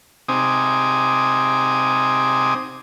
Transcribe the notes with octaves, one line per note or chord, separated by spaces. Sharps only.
C3 C4 D#4 G#5 D6 D#6